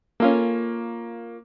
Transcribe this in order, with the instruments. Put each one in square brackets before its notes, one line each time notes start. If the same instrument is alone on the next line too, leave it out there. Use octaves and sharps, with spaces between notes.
[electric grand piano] A#3 [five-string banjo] C#4 F4 A4